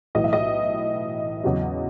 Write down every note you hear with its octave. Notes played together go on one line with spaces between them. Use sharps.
B1 A2 E3 D#5
E5
D#5
E2 C#3 F#3 C#4